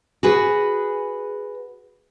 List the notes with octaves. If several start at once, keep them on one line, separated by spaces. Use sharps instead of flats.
F#4 G#4 B4